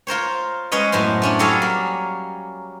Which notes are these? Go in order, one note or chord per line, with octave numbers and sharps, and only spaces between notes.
F4 A#4 C5 C#5
G#3 C#4 B4 C#5 D#5
F#2 A2 B3 C5
A3 C#4 D4
F#3 G3 G#4 A4 C#5 F5
A#3